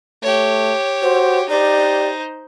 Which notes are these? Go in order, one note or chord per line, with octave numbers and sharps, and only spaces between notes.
A3 G4 C#5
F#4 C5
D#4 G4 C5 D5